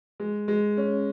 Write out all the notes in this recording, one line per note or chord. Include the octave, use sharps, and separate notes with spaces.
G#3
G#3
C#4